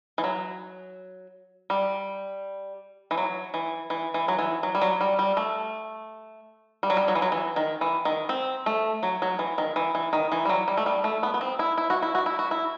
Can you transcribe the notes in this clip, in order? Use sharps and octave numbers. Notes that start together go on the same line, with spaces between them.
E3
F#3
G3
E3
F#3
E3
E3
E3
F#3
E3
F#3
G3
F#3
G3
G3
A3
G3
F#3
G3
F#3
E3
F#3
E3
D#3
E3
D#3
C4
A3
F#3
F#3
E3
D#3
E3
E3
D#3
E3
G3
F#3
G3
A3
G3
A3
B3
B3
C4
E4
E4
F#4
E4
F#4
E4
F#4
E4